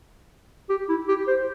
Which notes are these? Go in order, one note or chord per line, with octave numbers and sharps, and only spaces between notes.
G4
E4
G4
C5